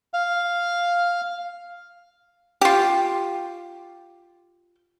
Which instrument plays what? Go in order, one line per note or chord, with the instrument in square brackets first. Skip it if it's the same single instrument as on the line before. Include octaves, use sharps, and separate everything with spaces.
[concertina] F5
[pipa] F4 G4